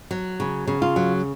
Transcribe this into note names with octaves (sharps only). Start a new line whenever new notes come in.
F#3
C#3
C#3
F4
F#3